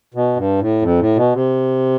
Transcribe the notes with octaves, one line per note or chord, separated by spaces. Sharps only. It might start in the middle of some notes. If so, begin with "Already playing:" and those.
B2
G2
A2
F2
A2
B2
C3